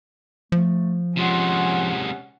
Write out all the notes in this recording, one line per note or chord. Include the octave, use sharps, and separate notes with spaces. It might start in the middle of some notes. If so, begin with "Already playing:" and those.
F3 A3
C3 G#3 C#4 F4 F#5